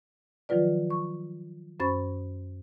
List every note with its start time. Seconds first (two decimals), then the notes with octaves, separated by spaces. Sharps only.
0.49 D#3 F3 F#3 F4 B4 D5
0.90 C#6
1.80 F#2 C#4 C5 B5 C#6 A6